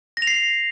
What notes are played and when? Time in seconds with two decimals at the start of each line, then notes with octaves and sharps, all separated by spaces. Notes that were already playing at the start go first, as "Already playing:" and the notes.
0.17 A#6
0.22 F7
0.27 C7